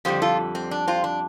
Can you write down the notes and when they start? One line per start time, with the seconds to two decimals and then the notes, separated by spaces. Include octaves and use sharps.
0.05 F2 D3 G3 G4 C5
0.22 F4 A4
0.55 C4
0.71 D4
0.88 C4 F4
1.04 D4